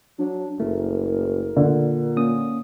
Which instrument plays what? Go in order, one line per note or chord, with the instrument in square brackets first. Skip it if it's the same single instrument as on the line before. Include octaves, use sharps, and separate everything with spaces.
[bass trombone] F#3 [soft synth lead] D4
[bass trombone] F#1 [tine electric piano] A3 [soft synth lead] A#4
[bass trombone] A#2 [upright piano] D3
[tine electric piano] A#3 C#4 D#6